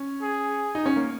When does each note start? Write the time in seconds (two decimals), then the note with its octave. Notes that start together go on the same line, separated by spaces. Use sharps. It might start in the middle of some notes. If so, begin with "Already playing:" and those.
Already playing: C#4
0.22 G#4
0.75 D#4
0.86 C#4
0.96 A#3